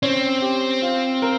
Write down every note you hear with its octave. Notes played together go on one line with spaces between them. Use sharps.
C4 C#4
G4
F4
A#4